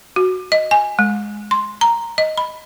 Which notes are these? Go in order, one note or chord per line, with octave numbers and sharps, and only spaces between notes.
F#4
D#5
G#5
G#3
C6
A#5
D#5
B5